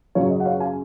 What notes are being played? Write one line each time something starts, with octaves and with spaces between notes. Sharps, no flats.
F#2 C#3 F#3 C#5 F5
D#5
F#5
C#5 F5
F5 G#5